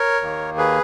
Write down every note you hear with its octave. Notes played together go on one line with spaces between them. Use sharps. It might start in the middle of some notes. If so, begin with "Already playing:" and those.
Already playing: A#4 C#5
D#2 D#3 A#3
G#4 B4